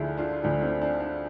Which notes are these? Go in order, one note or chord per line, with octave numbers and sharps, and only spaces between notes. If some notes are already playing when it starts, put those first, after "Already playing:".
Already playing: D2 D3 F3 E4 G#4 A4
D4 F4
D2 D3 F3 D4
C4
D4
D4